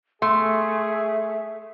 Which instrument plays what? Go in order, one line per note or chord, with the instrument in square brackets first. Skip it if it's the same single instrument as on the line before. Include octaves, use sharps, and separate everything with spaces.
[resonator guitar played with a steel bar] A3 [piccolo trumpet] G#4 [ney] E5 [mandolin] C6